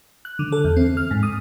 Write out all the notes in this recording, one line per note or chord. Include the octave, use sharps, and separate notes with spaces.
F#6
D3
A4
E2
C4
F6
G#2
D#6